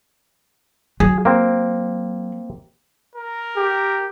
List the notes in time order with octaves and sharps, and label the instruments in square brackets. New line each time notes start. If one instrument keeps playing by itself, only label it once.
[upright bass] F#3 [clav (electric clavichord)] G#4
[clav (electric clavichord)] A#3 C4
[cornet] A#4
[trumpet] G4